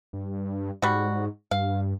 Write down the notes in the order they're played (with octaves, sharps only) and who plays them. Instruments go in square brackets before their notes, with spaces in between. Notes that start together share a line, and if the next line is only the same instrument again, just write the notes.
[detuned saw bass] G2
[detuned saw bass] G#2 [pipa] G3 F#4
[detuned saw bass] G2 [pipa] F5